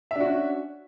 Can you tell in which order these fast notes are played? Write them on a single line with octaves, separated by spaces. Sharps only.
E5 D4 F#4 C#4